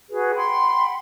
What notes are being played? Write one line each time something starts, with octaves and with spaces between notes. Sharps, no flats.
F#4 G#4 B4
F#5 G5 B5 C6